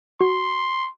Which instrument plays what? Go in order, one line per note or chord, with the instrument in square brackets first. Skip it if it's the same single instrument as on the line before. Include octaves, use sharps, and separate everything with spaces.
[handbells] F#4 [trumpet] C6